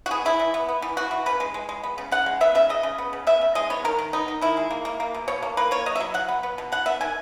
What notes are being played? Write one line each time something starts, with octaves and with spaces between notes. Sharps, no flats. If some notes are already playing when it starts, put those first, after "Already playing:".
F#4
B3 G#4
E3 E4
E3
B3
B3
E3
E3 F#4
E3
C#3 B4
G#3
G#3
G#3
B3
C#3
C#3 F#5
G#3
B3 E5
C#3 E5
C#3 D#5
C#3
B3
C#3
B3 E5
C#3
G#3 D#5
B3 C#5
D#3 A#4
D#3
B3 D#4
D#3
D#3 E4
G#3
A#3
A#3
A#3
B2
B2 C#5
A#3
A#3 B4
A#3 C#5
F#3 D#5
E5
F#3
F#3 F#5
B3
B3
B2
B2 F#5
B3 E5
D#3 G#5